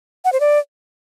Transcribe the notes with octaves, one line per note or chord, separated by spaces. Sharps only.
F#5
C5
D5